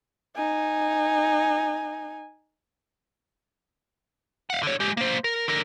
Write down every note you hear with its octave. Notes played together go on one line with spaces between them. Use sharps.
D#4 G#5
F5 F#5
D3 C#5
G#3 G4
A#3 C5
A#4
D3 A#4